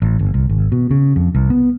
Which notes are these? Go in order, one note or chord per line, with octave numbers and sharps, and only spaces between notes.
A1
G1
C2
G#1
B2
C#3
F2
C2
B3